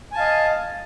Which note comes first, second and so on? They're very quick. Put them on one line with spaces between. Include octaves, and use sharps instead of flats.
G#5 A5 F5 D#5